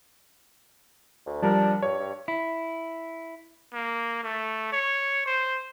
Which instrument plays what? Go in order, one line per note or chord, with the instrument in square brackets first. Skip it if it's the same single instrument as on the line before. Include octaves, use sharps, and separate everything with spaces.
[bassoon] D2
[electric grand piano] F3 G3 A#4 [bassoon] D4
[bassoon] G2 [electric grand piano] C#5
[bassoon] G2
[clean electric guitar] E4
[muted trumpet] A#3
A3
C#5
C5